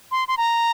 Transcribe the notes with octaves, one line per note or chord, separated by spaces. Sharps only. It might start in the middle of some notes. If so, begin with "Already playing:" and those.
C6
C6
A#5